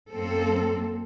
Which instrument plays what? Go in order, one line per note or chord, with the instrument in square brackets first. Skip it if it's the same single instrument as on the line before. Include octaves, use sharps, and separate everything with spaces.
[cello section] F#2 A#3 C4 A4